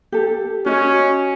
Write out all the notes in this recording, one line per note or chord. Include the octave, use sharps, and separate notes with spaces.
G4 A4
C#4 F#4 D#5